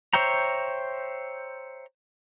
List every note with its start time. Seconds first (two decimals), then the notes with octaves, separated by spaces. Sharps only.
0.13 C5 C#5 E5 G5 A#5